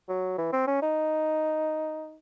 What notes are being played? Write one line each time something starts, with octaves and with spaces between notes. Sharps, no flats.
F#3
E3
C4
C#4
D#4